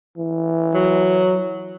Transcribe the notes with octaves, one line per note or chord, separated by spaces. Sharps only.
E3
F#3